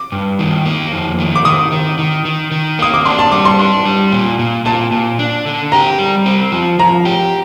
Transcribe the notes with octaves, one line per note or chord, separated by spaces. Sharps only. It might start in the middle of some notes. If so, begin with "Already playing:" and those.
Already playing: D6
G2
D#3
A#3
F2
D#3
D6
D#3 D#6
D#3
D#3
D#3
D#3
A#3 D#6
D6
D4 C6
A5
G3 D6
C6
D4
G3
A#2
A#2
A#2 A5
A#2
D4
D3
G4 A#5
G3
C4
F3
F3 A#5
G4